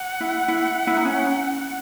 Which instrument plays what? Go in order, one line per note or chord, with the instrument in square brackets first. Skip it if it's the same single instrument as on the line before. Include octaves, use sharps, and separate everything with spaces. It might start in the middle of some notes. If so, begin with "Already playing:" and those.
Already playing: [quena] F#5
[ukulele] E4
E4
E4
D#4
C#4